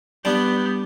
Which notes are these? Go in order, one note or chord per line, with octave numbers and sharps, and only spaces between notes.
G3 B3 D4 G6